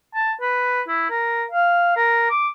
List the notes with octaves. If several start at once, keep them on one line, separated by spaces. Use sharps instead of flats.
A5
B4
E4
A#4
F5
A#4
D6